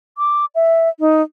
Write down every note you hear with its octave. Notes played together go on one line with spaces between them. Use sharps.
D6
E5
D#4